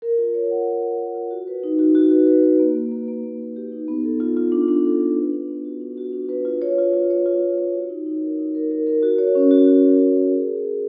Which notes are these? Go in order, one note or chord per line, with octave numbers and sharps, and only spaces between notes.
A#4
F4
C#5
F#5
F4
C#5
A#4
F4
F#4
B4
D#4
F#4
F#4
B4
B4
B4
A#3
A#3
A#3
A#3
A#3
A#3
G4
D#4
B3
A4
F4
F4
D4
D4
A4
F4
B4
D4
B3
F#4
D4
F#4
D4
B4
F4
C#5
F4
F4
C#5
F4
F4
C#5
F#4
D#4
D#4
A#4
D#4
A#4
A#4
A#4
F#4
C#5
C#4
F#4
F#4
A#4
C#4
A#4
G#4
G#4
G#4